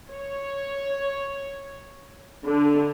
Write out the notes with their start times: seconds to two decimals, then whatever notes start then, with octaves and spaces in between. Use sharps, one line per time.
0.12 C#5
2.44 D3